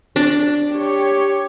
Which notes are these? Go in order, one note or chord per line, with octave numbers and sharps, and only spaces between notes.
D4
G4 C#5